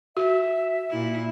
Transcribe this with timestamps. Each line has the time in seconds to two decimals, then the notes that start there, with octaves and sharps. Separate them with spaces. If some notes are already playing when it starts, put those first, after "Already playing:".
0.17 F#4 E5
0.90 A#2 E4